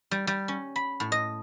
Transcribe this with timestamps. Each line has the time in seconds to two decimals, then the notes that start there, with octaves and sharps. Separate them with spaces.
0.11 G3
0.27 G3
0.48 C#4
0.76 B5
1.00 A2
1.12 D#5